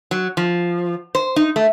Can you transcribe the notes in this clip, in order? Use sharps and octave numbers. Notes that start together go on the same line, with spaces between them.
F#3
F3
C5
D#4
A3